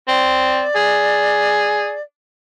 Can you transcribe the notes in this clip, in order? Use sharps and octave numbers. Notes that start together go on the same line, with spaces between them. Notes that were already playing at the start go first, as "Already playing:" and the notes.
C4 D5
G#4